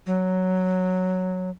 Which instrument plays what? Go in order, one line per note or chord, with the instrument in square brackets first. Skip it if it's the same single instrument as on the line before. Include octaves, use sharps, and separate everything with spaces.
[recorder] F#3